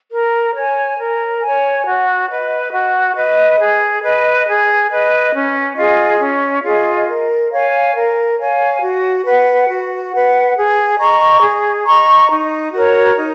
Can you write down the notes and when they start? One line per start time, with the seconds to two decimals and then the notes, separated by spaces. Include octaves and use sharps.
0.11 A#4
0.55 C#5 G#5
0.99 A#4
1.42 C#5 G#5
1.85 F#4
2.30 B4 D#5
2.72 F#4
3.16 B4 D#5
3.59 G#4
4.03 B4 D#5
4.47 G#4
4.91 B4 D#5
5.34 C#4
5.76 F4 G#4 D#5
6.21 C#4
6.64 F4 G#4 D#5
7.08 A#4
7.51 C#5 F5 G#5
7.95 A#4
8.38 C#5 F5 G#5
8.81 F#4
9.24 B4 F#5
9.68 F#4
10.12 B4 F#5
10.56 G#4
10.98 D#5 A#5 C#6
11.42 G#4
11.86 D#5 A#5 C#6
12.29 D#4
12.72 F#4 A#4 C#5
13.16 D#4